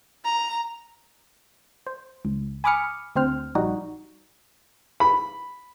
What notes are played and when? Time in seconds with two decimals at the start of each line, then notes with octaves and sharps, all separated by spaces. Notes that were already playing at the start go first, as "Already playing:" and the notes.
0.25 A#5
1.86 C5
2.25 C#2
2.64 G#5 B5 D6 D#6 F6 C#7
3.15 D2 C4 C5 F6
3.55 A#1 G3 D#4 F#4
5.00 B5